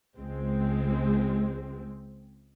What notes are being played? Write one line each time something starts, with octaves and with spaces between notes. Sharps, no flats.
C#2 G#3 C4